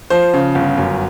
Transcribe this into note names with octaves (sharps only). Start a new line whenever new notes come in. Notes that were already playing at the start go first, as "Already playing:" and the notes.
F3 C5
C#3
G1
F#2